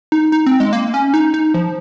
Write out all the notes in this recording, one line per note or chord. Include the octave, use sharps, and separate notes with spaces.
D#4
D#4
C4
G#3
A#3
C#4
D#4
D#4
F3